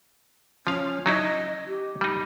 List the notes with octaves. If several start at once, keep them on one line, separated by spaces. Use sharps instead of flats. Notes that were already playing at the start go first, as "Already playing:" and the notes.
F3 C#4 F5
F#3 D#4 E4 D#5
G4
G3 D#4